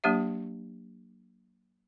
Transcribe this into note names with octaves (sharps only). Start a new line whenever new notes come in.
F#3 A#3 D4 G4 E5